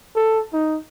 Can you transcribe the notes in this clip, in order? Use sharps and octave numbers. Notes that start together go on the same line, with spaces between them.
A4
D#4